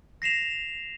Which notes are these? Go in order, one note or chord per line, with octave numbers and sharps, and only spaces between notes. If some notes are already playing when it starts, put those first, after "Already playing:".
A#6 C7 E7 F7